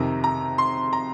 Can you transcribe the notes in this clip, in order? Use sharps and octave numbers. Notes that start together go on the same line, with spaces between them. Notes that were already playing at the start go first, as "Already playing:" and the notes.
Already playing: F2 C3 D#3 A#5
A#5
C6
A#5